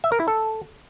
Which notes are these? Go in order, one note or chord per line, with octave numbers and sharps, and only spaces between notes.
E5
A#4
E4
A4